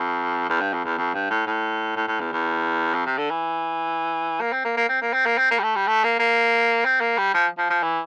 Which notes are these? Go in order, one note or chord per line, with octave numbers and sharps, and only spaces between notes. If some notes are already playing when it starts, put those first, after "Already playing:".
Already playing: F2
E2
G2
F2
E2
F2
G2
A2
A2
A2
A2
E2
E2
F2
C3
D3
E3
A#3
C4
A#3
A#3
C4
A#3
C4
A#3
C4
A#3
G3
A3
G3
A3
A#3
A#3
C4
A#3
G3
F3
F3
F3
E3